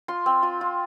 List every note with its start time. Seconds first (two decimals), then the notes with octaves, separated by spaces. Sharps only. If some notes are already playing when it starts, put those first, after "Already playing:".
0.08 F4 C6
0.26 C4
0.43 F4
0.61 F4